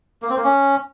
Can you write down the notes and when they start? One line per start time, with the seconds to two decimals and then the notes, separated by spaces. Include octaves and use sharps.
0.22 A#3
0.30 C4
0.37 A#3
0.44 C#4